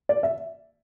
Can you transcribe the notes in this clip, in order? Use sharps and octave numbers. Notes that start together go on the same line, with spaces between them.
D5
E5